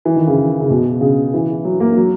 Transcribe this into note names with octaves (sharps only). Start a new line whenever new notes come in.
E3
D#3
C#3
C#3
B2
C#3
E3
F#3
A#3
F#3